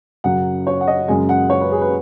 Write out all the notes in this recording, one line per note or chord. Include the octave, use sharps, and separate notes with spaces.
F#2 C#3 F#3 F#5
C#5
F#5
D#5
F#2 C#3 G#3 G#5
F#5
C#5
B4
G#4
B4